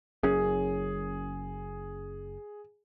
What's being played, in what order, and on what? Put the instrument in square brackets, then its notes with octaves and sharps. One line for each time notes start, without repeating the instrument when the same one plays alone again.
[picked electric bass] F#1 F#2 C#4 [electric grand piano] G#4